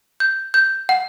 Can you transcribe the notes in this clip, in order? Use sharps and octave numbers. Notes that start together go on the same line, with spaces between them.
G6
G6
F#5